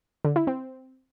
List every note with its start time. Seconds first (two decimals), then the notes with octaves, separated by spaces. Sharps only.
0.25 D3
0.36 E4
0.47 C4